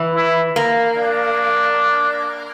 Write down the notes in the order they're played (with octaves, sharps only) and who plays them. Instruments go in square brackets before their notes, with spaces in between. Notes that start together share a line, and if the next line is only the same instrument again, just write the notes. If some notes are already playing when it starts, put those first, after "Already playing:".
Already playing: [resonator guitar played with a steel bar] E3
[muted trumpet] E4
[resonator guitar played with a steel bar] A#3
[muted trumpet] D4